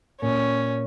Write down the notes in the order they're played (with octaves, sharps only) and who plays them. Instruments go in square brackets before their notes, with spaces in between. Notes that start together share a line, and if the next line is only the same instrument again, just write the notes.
[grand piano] A#2 [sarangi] C#4